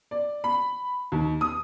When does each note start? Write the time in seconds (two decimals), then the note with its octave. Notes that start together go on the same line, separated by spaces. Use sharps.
0.11 D5
0.44 B5
1.12 D#2
1.41 D#6